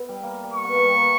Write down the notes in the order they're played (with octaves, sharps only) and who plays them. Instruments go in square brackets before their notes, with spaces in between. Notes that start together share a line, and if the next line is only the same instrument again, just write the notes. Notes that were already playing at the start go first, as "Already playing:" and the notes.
Already playing: [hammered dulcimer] B3 E4
G3
A#3
G3
[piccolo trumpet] C#6
[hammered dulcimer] B3
A#3
G3
A#3